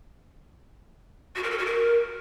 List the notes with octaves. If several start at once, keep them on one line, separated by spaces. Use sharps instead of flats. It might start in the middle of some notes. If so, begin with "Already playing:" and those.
F#4
A#4
A4
F#4
A#4